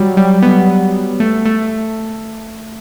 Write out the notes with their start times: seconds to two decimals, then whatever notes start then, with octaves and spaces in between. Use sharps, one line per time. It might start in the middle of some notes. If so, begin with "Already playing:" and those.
Already playing: F#3 G3
0.17 G3
0.42 B3
1.20 A3
1.45 A3